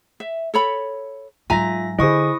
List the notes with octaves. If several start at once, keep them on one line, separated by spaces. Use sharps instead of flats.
E5
A4 C#5 B5
G#2 F#3 F4 E5 G#5 A#5 A#6
D3 E4 G#4 C5 D#5 C#6 D#6